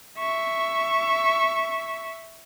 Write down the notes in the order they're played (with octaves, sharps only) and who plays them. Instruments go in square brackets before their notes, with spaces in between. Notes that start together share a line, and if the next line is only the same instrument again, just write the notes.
[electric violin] E5 C#6